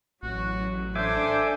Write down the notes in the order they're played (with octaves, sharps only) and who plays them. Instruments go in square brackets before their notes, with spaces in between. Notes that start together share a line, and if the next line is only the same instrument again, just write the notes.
[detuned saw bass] A1 [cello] F#3 [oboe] F#4
[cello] D4 A4 [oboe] C5 [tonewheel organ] E5 G#5 D6